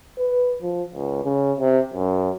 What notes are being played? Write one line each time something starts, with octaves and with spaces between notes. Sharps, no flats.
B4
F3
C#2
C#3
C3
F#2